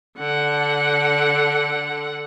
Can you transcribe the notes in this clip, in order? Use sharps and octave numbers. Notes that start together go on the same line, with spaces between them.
D3 F#5